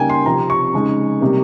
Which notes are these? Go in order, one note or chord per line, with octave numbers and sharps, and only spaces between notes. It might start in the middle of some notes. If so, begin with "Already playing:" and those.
Already playing: C#3 G3 A#3 D#4 G5 G#5
C6
C3 F3 C4 A#5
C#6
C#3 G#3 D#4
C3 G3 A#3